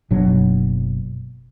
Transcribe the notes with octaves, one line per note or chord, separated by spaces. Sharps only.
F#1 B2 F#3 D4